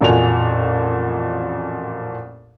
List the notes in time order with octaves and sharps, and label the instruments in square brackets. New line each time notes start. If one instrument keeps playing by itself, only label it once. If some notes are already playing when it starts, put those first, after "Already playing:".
[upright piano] A1 F2 A#2 F#4 G#5 F7